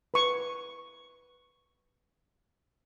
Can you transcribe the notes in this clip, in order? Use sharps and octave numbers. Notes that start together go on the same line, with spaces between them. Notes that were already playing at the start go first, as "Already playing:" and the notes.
B4 C#6